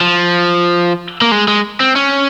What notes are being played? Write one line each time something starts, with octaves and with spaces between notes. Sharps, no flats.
F3
A#3
G#3
G#3
C4
C#4